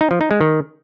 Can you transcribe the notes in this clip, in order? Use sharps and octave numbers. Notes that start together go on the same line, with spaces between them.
D#4
F3
D#4
G#3
D#3